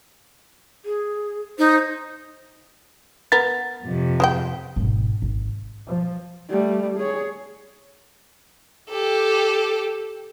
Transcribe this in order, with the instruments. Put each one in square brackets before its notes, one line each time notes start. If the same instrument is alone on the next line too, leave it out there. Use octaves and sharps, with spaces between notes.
[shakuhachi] G#4
[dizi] D#4 [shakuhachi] C5
[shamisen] B3 A#4 [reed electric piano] A6
[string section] F2 C3
[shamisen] G#3 C5 G5
[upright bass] G#1 B2
G#1
[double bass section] F3
[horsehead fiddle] G3 A3
G#4 C#5
[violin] G4 A4